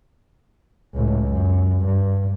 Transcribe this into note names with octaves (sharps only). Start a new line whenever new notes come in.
C#2 A2
F#2
G2